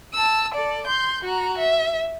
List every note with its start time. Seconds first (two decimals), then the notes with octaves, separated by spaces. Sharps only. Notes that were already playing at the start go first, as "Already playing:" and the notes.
0.14 A5 E6
0.54 A4 D5
0.87 C6 G6
1.24 F#4 A#5
1.58 E5